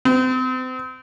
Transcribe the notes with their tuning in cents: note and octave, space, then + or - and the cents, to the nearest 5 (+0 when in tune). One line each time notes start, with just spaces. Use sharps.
C4 -35